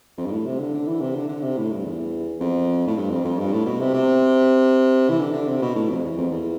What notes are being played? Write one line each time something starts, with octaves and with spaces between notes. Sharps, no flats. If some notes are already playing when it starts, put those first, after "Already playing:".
F2
G2
A2
C3
D3
D3
E3
C3
D3
D3
C3
A2
G2
E2
F2
A2
G2
F2
F2
G2
A2
B2
C3
C3
E3
D3
D3
C3
B2
A2
F2
E2
F2
E2